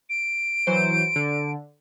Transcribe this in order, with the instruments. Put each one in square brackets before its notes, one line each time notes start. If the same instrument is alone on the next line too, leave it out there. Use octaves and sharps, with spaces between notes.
[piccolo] D7
[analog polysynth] E3 F#3 C5
D3